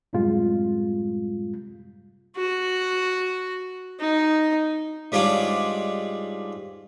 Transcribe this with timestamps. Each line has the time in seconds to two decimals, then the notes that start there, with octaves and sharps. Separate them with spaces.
0.13 F#2 A2 C3 G3 G#3 F4
2.37 F#4
4.00 D#4
5.12 G#2 G3 D4 F4 C#5 D6